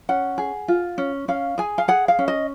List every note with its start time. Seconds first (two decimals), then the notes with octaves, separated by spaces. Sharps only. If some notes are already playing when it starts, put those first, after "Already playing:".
0.09 C#4 F#5
0.38 G#4
0.68 F4
0.98 C#4
1.28 C#4 F5
1.58 G#4 G#5
1.78 F5
1.88 G#4 F#5
2.08 F5
2.19 C#4
2.28 D#5